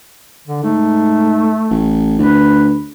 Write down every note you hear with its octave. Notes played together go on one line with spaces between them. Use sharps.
D3
G#2 A3
A1
D2 B4